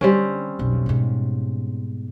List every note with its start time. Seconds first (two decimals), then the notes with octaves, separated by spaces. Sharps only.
0.01 D3 G3 C4 C#4
0.59 B1 F2
0.86 G#2 B2